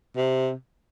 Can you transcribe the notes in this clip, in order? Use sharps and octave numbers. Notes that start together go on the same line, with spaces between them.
C3